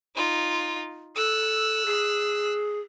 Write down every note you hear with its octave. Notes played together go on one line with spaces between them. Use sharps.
D#4 F4
A4 E6 F#6
G#4